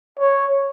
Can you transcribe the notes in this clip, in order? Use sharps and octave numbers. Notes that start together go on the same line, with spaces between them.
C#5